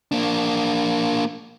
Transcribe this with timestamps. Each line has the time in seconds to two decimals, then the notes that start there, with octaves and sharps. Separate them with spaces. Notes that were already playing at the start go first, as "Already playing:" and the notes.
0.12 A#3 D4